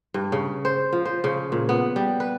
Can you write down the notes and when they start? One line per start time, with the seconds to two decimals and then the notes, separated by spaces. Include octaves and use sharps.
0.14 G2
0.32 C#3
0.65 C5
0.93 F3
1.05 C5
1.24 C#3
1.52 A#2
1.69 B3
1.96 G3
2.20 B4